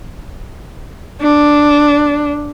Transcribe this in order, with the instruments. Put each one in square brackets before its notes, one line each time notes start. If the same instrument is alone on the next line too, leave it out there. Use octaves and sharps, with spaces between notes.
[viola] D4